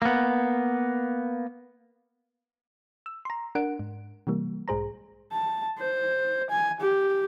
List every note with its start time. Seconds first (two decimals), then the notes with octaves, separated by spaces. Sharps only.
0.02 A#3 B3
3.06 E6
3.25 A#5 C6
3.55 D4 A#4 F#5 D7
3.79 G#2
4.27 C3 E3 G3 A#3
4.68 B1 G#2 G#4 C5 A#5
5.32 A5
5.79 C5
6.50 G#5
6.81 G4